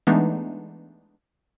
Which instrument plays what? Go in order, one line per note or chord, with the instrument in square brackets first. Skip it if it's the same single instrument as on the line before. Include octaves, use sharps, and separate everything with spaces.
[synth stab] E3 G#3 A3 B3 D4 D#4